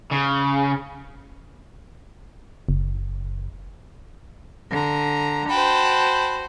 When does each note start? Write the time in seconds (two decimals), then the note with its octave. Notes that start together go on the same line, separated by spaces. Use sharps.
0.12 C#3
2.69 F#1
4.71 D3 A#5
5.49 F#4 C5 G5 A5 B5